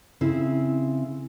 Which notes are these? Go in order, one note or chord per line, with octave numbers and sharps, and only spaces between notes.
C#3 C4 E4